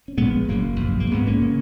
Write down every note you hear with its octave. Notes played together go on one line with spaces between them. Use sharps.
C#4
A#1 A#2 G#3 B3
F#1 F#2 C#3 F#3 A#3
A#1 G#2
A#3
G#1 G#2 G#3 B3
A#3 C#4
C#3